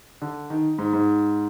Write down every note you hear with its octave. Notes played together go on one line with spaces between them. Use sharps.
D3
D#3
G#2
G#2